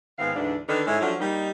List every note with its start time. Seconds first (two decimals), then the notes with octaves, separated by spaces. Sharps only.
0.19 G#2 D#3 B3 C4 F5
0.35 D2 G#2 E3 D4
0.68 D3 D#3 D4 D#4 A4 B4
0.87 G#2 G#3 A3 C#4 E4 E5
1.01 F3 F#3 A3 C#4 D4 F#4
1.19 G3 A#3 D#4